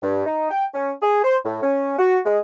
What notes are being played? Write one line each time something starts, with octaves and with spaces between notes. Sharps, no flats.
G2
D#4
G5
C#4
G#4
C5
A2
C#4
F#4
G#3